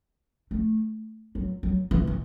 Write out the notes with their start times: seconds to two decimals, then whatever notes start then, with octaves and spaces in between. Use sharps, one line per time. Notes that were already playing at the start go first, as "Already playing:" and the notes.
0.51 A3
1.35 F#3
1.63 F#3
1.91 E3
2.07 E3